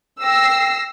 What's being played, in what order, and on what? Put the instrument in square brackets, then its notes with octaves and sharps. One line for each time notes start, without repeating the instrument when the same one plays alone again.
[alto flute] G5 [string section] E6 A#6 C7